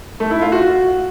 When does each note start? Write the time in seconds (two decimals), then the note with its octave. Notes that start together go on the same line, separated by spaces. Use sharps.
0.20 A3
0.31 E4
0.41 F4
0.52 F#4